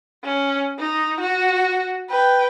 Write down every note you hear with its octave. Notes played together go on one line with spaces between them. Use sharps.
C#4
D#4
F#4
B4 G5